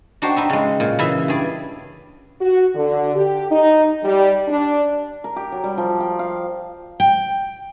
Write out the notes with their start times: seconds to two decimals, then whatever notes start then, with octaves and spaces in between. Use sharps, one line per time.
0.22 D4 D#4 F#4 G4 C5
0.36 D#4 B4 E5
0.50 C#3 G#3
0.80 A#2
0.99 C#3 E3 E4 G#4 E5
1.28 G2 G#4 D5
2.40 F#4
2.75 D3
3.15 G4
3.50 D#4
4.03 G3
4.48 D4
5.24 A#4
5.36 G4
5.52 F#3
5.64 G3
5.78 F3
6.00 G5
6.19 F5
7.00 G5